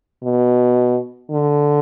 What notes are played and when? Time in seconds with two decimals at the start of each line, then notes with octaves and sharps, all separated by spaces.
0.23 B2
1.31 D3